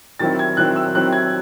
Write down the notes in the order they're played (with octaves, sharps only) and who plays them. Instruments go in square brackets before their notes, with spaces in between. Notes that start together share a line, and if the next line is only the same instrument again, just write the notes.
[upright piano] D#3 F#3 C4 E4 A6
G#6
D#3 F#3 C4 E4 F#6
E6
D#3 F#3 C4 E4 F#6
G#6